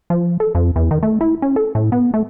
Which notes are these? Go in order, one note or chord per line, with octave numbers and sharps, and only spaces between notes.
F3
A4
F2
E2
D#3
A3
E4
C#4
A4
A2
B3
A3